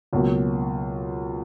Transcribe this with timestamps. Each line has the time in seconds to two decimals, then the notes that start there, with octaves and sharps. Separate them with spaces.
0.13 C#2 B2 F#3 A#3